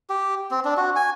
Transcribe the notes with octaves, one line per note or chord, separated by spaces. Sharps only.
G4
C4
D4
F#4
G#5